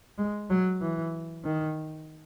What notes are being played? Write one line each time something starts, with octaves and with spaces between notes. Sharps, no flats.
G#3
F#3
E3
D#3